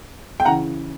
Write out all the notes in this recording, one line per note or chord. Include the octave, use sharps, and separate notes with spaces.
G5
C#3 E3 F#5 A#5